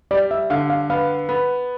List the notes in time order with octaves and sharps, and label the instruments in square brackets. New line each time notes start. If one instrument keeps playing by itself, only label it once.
[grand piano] G3 [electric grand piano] D5
[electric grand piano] E5
[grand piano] D3 [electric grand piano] F5
[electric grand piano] F5
[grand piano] B3 [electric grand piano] F5
[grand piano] B3